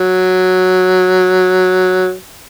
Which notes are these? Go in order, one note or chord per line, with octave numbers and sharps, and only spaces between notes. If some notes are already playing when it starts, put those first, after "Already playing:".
Already playing: F#3